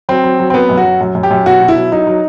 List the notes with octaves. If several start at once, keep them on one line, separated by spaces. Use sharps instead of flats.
F#3 C4
F#3
F#3
C4
F#3 B3
F#2
F#4
F#3
F#2
F#2
G4
F#2
B2 F#4
B2
E4
F#3
F#3 D#4
F#3